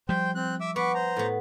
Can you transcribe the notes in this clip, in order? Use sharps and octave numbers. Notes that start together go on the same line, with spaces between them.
F3 G3 C5 G5
C4 F#6
E5 D6 E6
B3 B4 C#6 D6
C5 A#5
A2 B3